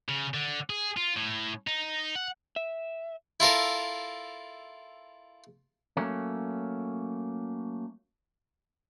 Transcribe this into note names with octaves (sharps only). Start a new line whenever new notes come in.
C#3
D3
G#4
F4
A2
D#4
F#5
E5
E4 F4 A4 A#4
F#3 A3 A#3 C#4